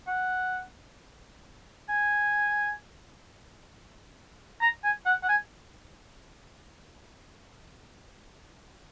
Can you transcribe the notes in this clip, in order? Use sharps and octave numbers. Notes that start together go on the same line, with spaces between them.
F#5
G#5
A#5
G#5
F#5
F#5
G#5